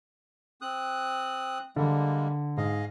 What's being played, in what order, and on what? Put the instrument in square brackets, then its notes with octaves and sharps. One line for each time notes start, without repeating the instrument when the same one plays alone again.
[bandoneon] C4 D#6 F#6
[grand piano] D3 [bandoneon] G3 G#3 A#3
[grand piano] G#2 [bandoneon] G#4 D#5 F5